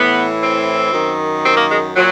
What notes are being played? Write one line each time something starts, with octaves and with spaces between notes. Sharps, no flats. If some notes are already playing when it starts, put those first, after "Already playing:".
Already playing: A2 E3 B3
C4
F#2 D#3
C4
A#3
G#3
A#2 F#3